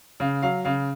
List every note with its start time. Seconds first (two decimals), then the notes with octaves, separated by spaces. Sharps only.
0.20 C#3 F5
0.43 F#3 F5
0.65 C#3 F5